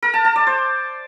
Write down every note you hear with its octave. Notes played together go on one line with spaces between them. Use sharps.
A#4
A5
A5
D5
C5